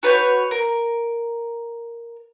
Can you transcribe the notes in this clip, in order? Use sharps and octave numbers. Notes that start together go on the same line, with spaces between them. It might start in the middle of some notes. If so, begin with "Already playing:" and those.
F#4 B4 C#5 G6
A#4